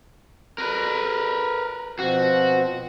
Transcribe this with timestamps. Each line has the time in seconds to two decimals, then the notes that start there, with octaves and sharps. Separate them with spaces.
0.58 A#4 B4
1.99 B2 F3 C4 F#4